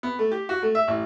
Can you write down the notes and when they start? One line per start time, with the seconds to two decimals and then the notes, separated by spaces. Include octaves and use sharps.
0.03 B3
0.19 A3
0.32 G4
0.49 F#4
0.62 A3
0.75 E5
0.88 A1